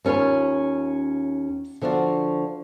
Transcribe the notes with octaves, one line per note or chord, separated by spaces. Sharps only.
D#2 C#4 F4 B4 C#5
D3 F3 D4 F4 F#4